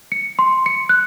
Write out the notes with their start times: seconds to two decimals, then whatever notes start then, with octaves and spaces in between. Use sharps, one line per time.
0.12 C#7
0.39 C6
0.66 C#7
0.89 F#6